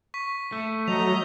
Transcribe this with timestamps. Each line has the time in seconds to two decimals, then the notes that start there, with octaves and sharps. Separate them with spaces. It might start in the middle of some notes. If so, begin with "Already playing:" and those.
0.14 C#6 B6
0.52 A3
0.88 F#3 D#5 A#5 F7